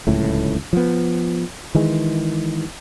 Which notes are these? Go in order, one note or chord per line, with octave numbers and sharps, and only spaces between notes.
D1 C#2 A2 A3
F3 B3
D#3 E3 G#3